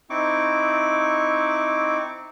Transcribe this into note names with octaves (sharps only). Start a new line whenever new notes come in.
C4 D#4 E4 C#6 D6